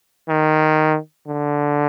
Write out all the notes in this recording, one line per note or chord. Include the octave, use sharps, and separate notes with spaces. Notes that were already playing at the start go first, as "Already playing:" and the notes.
D#3
D3